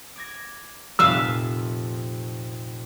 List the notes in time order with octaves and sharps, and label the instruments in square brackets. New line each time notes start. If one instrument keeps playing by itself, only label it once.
[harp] D6 G#6 A#6
[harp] F1 F2 A#2 [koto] B4 E5 F5 [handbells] E6